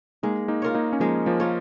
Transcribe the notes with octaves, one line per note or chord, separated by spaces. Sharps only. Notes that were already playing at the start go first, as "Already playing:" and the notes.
G#3 A#3 D#4
A#3 D#4
F4 A#4 C#5
A#3 D#4
C#4
F3 G#3 A#3
F3 A#3
F4 A#4 C#5